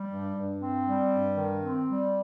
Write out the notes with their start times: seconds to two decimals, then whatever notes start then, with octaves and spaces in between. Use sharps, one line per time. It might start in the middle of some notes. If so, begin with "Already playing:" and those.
Already playing: G3
0.10 G2
0.36 G2
0.61 C4
0.87 G3
1.12 G2
1.37 D#3
1.62 C4
1.88 G3